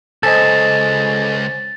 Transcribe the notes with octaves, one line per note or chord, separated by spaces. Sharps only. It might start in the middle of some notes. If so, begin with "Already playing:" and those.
C#2 A4 C5 D#5 G#5 A6 E7